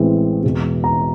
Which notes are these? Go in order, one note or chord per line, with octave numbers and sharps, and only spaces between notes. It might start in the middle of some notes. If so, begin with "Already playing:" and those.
Already playing: A1 A2 E3 G#3 C4
E2 B2 G#3
A#5